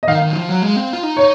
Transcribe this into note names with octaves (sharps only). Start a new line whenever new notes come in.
D#5
D#3 F5
D#3
F#3
F3
F#3
G#3
C4
F4
D#4
C#5